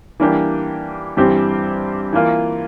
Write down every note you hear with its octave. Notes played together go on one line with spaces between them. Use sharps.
E3 G3 A#3 D4 G4
G2 E3 G3 C4 G4
E3 A#3 F4